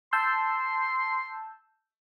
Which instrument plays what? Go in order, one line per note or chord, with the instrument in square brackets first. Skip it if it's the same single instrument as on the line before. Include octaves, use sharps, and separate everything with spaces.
[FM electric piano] A5 E6 G6 [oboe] C6